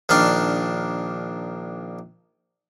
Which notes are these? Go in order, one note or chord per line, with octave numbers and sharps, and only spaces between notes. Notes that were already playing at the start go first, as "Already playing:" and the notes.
A#1 D#3 D4 F5